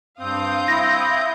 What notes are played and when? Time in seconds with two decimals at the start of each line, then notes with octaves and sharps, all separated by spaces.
0.20 G2 C4 F5 D#6 G6
0.68 E4 A#6